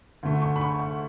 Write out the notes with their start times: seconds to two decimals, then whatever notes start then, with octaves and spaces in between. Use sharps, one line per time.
0.23 D2 D3 A3
0.42 C#6
0.56 B5
0.61 C#6
0.79 C#6